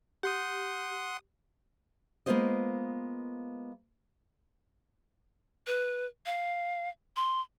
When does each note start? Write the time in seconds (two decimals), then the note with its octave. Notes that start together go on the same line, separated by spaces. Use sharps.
0.23 G4 F#5 C6 D#6
2.26 G#3 A#3 B3 F4 C5 D#5
5.67 B4
6.26 F5
7.16 C6